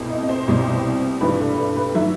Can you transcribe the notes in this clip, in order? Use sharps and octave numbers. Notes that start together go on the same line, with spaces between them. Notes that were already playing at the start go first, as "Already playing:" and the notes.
Already playing: C2 B2 A3 C4
D#5
D#5
C5
C2 B2 G3 C4
G2 E3 G3 B4
A4
B4
B4
D#3 F#3 A3 E5